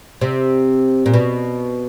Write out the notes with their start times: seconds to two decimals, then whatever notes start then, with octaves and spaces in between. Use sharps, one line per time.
0.21 C3
1.06 A#2
1.13 B2